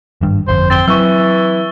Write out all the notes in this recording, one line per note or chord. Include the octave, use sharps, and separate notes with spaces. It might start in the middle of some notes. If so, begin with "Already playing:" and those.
G#1 G2
G1 F2 C5
C4 A6 G7
E3 F#3 C4 C#6 E6